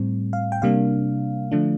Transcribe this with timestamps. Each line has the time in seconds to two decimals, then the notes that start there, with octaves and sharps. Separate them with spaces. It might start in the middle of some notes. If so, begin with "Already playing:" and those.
Already playing: A2 G3 C4
0.33 F5
0.52 G5
0.62 C3 G3 A#3 D4 F5
1.52 D3 F3 A3 D4